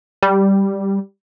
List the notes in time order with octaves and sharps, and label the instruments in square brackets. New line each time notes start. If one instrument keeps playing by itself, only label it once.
[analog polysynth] G3